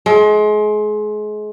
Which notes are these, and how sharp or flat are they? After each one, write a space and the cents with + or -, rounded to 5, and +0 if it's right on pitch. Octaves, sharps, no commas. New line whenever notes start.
G#3 +30